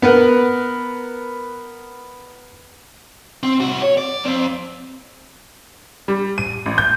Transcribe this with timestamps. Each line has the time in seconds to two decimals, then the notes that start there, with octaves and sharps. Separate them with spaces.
0.02 B3 A#4 B4 F#5
3.43 C4
3.60 C2 F#4
3.82 C#5
3.97 D5
4.25 F2 C4
6.08 G3
6.38 D#7
6.66 A1
6.78 G6